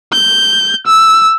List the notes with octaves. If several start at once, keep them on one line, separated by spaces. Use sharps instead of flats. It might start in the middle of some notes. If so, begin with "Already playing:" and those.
G6
E6